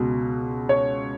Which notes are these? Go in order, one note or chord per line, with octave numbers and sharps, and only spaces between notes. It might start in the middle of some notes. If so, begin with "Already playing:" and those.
Already playing: C#2 B2
C#5